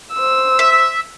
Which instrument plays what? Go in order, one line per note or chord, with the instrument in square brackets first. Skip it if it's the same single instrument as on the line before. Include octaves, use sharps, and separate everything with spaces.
[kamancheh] C5 E6
[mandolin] E5